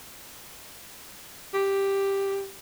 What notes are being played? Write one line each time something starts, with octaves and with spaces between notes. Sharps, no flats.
G4